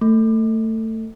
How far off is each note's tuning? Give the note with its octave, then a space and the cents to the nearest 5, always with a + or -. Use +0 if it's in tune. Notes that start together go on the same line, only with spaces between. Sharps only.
A3 +20